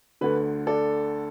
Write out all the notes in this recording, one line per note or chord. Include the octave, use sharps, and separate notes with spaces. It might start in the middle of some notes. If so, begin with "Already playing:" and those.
D2 D3 B4
A4 D5